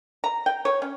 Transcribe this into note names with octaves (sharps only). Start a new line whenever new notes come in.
A#5
G5
C#5
C#4